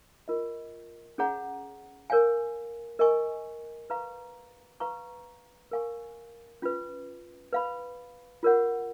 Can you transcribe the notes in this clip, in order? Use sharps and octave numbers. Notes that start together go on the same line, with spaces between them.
F4 A#4 D#5
C#4 G#4 C#5 F#5 A#5
A#4 C#5 F5 G#5
A#4 D#5 G#5 C#6
B4 F5 A#5 C#6
B4 F5 A#5 C#6
A#4 F5 G#5 C#6
C#4 F4 B4
B4 F5 B5
F4 A#4 C#5 F#5